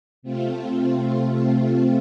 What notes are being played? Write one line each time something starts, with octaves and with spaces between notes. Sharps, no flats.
C3 A3 C4 F4